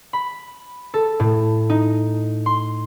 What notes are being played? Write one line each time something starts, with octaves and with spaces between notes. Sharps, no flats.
B5
A4
A2
D#4
C6